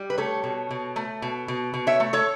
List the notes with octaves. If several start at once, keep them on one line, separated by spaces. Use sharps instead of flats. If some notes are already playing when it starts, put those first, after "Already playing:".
Already playing: G3
B4
A3 A4 C#5
B2
B2
A3
B2
B2
B2
C#5 E5
A3
A4 C#5